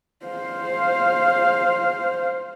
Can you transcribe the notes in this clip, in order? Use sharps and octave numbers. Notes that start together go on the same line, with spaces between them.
C5 F5